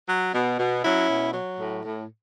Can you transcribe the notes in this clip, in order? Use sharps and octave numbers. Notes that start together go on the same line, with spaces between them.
F#3
B2
B2
F#3 C#4 E4
B2
F#3
A2
A2